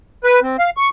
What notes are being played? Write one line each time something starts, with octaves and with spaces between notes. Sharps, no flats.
B4
C4
F5
C#6